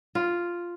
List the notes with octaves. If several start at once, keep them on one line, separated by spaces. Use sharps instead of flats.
F4